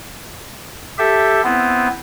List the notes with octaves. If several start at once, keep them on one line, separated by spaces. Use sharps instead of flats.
G4 A4 E5
B3 C4 E4